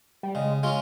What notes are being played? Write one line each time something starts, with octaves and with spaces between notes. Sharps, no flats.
G3
C#3 G#3
G#3 C#4 F4